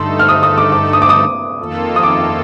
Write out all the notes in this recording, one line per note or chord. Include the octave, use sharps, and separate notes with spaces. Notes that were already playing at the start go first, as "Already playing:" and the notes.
Already playing: G2 D3 A3 D#4 A4 C6
F6
D#6
D#6
D6
D6
D#6
D6
D#6
F2 D#3 A#3 F4 A4
D#6
D6